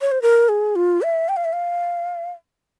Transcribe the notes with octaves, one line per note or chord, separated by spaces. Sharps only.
C#5
C5
A#4
G#4
F4
E5
G5
F5
E5
F5